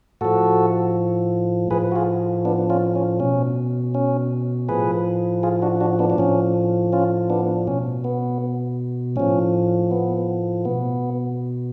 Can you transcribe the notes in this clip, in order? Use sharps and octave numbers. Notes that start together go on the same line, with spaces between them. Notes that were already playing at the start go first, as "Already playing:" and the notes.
A2 F3 F#4 A4
A2 F3 G#4 B4
F#4
F4 G#4
B3 D4
C#4 F4
C#4
B2 C#4
C#4
A2 F3 G#4 B4
F4 G#4
D4 F#4
D4 F#4
B3 D4
D4
A2 F3 C#4
C#4 F4
B3 D4
B2 C#4
B3
A2 F3 C#4
B3
B2 B3